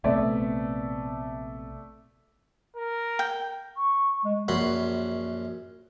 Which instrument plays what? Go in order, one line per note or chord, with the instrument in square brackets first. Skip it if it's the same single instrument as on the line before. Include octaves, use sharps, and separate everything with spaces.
[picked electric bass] A#1 C3 B3 [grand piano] A3 D5 E5
[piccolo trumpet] A#4
[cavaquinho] G5
[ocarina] C#6
[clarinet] G#3
[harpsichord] A#1 F#2 F#4 B5 C6